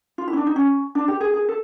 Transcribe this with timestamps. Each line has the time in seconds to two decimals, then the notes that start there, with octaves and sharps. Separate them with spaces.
0.18 F4
0.28 E4
0.33 C#4
0.37 D4
0.47 D#4
0.56 C#4
0.95 D4
1.08 G4
1.21 G#4
1.34 G#4
1.49 A4